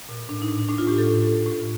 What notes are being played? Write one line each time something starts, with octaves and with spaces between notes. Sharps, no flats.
A#2
A2 D4
D#4
A2
A2 D4
F4
A2 G4
A4
A2
A2
A2